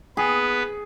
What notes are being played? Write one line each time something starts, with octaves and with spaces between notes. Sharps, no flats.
B3 G#4 B4